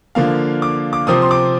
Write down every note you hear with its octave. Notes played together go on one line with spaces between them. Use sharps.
D3 F3 A#3 F5
D6
D6
C3 F3 C4 D#6
C6
D6